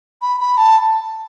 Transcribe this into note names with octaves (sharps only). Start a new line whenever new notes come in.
B5
B5
A5